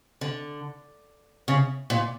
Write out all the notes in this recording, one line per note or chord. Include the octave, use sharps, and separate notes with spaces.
D3
C#3
A#2